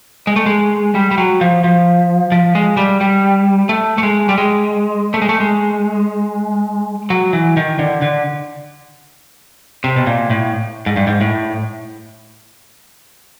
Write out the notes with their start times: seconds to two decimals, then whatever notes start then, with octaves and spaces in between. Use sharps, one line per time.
0.27 G#3
0.36 A3
0.46 G#3
0.95 G3
1.11 G3
1.18 F#3
1.41 F3
1.64 F3
2.32 F3
2.55 G#3
2.77 G3
3.01 G3
3.69 A3
3.98 A3
4.03 G#3
4.29 G3
4.38 G#3
5.14 A3
5.22 G#3
5.29 A3
5.40 G#3
7.10 F#3
7.33 E3
7.57 D#3
7.79 D3
8.02 D3
9.84 C3
9.96 B2
10.07 A#2
10.30 A2
10.86 G#2
10.96 G2
11.07 G#2
11.21 A2